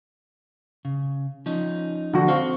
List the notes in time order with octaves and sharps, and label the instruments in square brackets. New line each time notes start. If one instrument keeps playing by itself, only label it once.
[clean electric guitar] C#3
F3 C#4 D#4
[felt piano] D3 F#4 [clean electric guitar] F3
[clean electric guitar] C4 C5 [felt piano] F5 C#6